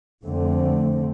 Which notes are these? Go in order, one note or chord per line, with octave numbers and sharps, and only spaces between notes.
F2 D3 A3 C4